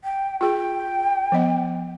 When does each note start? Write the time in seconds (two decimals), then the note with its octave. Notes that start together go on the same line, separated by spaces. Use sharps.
0.04 G5
0.41 F4 G#4 G5
1.32 F3 B3 D#5